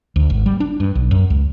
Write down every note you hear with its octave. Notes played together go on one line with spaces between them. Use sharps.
D2
G#1
G3
D4
G2
B1
F#2
C#2